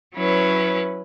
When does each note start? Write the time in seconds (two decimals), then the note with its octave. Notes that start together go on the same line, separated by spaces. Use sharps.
0.14 F#3 C#4 E4 B4